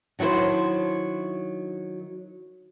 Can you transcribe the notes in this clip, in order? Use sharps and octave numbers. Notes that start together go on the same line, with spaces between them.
D#3 F#3 D4 E4 C5